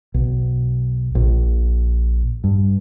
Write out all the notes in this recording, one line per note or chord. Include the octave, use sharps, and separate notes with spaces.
B1
A#1
G2